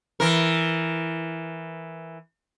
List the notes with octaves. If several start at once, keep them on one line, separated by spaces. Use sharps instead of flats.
E3 A#4